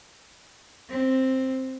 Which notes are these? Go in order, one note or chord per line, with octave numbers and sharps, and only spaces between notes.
C4